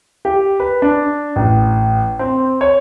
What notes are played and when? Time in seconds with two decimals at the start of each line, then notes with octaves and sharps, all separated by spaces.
0.25 G4
0.60 B4
0.82 D4
1.36 A1
2.19 C4
2.61 C#5